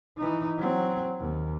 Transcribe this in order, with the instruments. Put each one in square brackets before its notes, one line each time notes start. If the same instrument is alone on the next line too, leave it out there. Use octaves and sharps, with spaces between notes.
[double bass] E3 D#4
F#3 C4
D#2